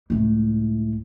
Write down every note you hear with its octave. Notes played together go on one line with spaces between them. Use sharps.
C#2 A2